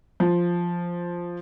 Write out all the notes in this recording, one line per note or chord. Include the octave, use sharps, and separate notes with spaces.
F3